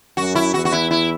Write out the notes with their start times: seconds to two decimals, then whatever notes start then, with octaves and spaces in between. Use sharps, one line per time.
0.17 F#2 F#4
0.35 E4
0.54 E2 F#4
0.65 F#4
0.72 E4
0.91 E4